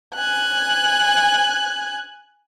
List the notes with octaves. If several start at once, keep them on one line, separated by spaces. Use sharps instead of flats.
G#5 F#6